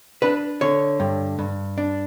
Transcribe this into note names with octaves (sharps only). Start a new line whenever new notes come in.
D4 B4
D3 C#5
G2
G2
D4